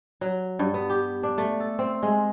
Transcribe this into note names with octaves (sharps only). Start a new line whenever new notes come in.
F#3
G2
B3
G4
D4
A3
A4
C4
G#3